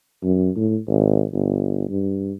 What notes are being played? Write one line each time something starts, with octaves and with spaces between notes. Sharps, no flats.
F#2
A2
G#1
G1
G2